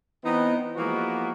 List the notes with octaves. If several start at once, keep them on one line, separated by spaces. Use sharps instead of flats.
E3 B3 C4 D#4 D#5
E3 F3 G#3 A#3 B3 F#4